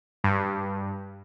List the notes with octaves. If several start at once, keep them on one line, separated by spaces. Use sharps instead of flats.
G2